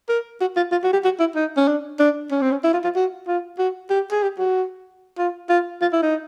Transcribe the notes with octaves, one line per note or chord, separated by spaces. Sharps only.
A#4
F#4
F4
F4
F#4
G4
F#4
E4
D#4
C#4
D4
D4
C#4
C4
C#4
E4
F4
F4
F#4
F4
F#4
G4
G#4
G4
F#4
F4
F4
F4
E4
D#4